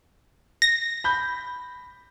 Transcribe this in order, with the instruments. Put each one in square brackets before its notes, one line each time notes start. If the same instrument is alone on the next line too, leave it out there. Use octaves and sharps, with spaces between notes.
[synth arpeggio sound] A#6
[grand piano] B5 G6